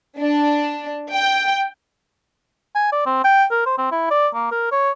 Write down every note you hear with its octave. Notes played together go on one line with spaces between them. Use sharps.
D4
G5
G#5
D5
C4
G5
A#4
C5
C4
E4
D5
A#3
A#4
C#5